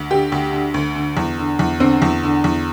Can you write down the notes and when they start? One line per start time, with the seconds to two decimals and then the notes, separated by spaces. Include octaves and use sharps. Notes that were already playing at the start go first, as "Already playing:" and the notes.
Already playing: D2
0.11 D3 G4
0.32 D2
0.53 D3
0.74 D2
0.95 D3
1.17 E2
1.38 D3
1.59 E2
1.80 D3 C4
2.02 E2
2.23 D3
2.44 E2